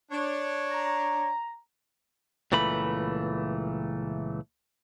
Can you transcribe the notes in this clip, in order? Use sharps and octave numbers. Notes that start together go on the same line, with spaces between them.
D4 C#5
A#5
C#2 A#2 E3 A3 B5